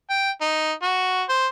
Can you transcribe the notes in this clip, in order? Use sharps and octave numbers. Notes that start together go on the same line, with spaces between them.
G5
D#4
F#4
C5